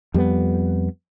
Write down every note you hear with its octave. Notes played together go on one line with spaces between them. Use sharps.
F2 G3 G#3 B3